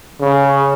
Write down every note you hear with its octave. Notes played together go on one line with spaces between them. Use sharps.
C#3